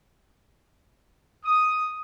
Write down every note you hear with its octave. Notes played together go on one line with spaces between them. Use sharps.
D#6